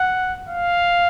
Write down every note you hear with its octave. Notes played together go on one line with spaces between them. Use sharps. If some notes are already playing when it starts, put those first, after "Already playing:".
Already playing: F#5
F5